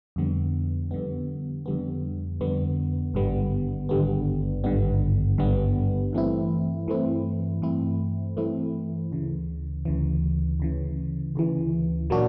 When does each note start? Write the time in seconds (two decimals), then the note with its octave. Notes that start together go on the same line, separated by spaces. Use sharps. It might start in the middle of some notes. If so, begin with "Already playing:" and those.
0.16 F2 D3 G3 B3
0.91 F2 D3 G3 B3
1.66 F2 D3 G3 B3
2.41 F2 D3 G3 B3
3.14 G#1 G2 D3 G3 B3
3.89 G#1 G2 D3 G3 B3
4.64 G#1 G2 D3 G3 B3
5.38 G#1 G2 D3 G3 B3
6.13 G2 E3 A3 C4 E4
6.88 G2 E3 A3 C4 E4
7.62 G2 E3 A3 C4 E4
8.37 G2 E3 A3 C4 E4
9.12 D2 C#3 E3
9.85 D2 C#3 E3
10.60 D2 C#3 E3
11.35 D2 C#3 E3
12.10 A#2 F#3 A#3 D4 F#4